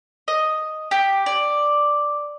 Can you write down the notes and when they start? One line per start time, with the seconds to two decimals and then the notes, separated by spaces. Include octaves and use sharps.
0.28 D#5
0.91 G4
1.26 D5